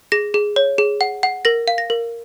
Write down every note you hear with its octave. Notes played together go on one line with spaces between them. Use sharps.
G#4 A#6
G#4
C#5
G#4
F#5
F#5
A#4 A#6
F5
A#6
A#4